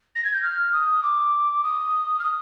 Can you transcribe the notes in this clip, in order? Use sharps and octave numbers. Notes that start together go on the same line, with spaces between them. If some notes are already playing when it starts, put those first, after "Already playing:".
A#6
G#6
G6
F6
D#6
D6
D#6
F6
D#6